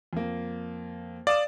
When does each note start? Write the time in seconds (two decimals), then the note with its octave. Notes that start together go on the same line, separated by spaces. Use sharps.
0.13 F2 A#3
1.27 D5 F5 D#6 E7